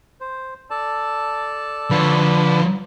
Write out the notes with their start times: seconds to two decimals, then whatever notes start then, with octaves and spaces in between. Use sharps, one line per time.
0.21 C5
0.70 A4 D5 A5
1.91 D3 F3 B4 C#5